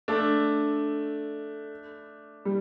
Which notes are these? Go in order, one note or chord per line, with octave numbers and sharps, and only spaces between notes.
A3 D4
G3